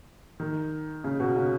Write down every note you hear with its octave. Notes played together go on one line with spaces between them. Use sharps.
D#3
C#3
B2
C#3